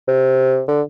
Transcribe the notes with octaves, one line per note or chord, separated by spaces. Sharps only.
C3
D3